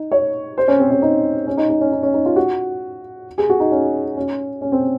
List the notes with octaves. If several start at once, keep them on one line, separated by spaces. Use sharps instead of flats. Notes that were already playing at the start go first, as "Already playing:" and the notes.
Already playing: D#4
C#5
C5
C#4
C4
C#4
D#4
C#4
D#4
D#4
C#4
D#4
C#4
D#4
F4
F#4
G#4
F#4
D#4
C#4
C#4
C#4
C4